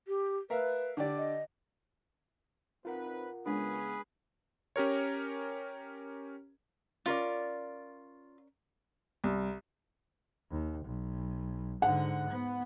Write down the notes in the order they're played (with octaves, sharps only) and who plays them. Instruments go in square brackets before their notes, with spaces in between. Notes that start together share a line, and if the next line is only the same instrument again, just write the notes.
[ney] G4
[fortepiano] A#4 E5 F5 [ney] B4
[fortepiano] D3 G4 D5
[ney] D#5
[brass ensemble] C4 D#4 B4 [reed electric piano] F4 A#4 F#5
[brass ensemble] C#3 B3 C#4 [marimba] G#3 D4 [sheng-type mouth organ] G#4 B4
[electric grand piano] C#4 G4 A#4 C#5
[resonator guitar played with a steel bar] C#4 A#4 D5 [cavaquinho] F4
[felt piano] C2
[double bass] D#2
B1
[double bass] G#2 D3 [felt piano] F#5
[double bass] B3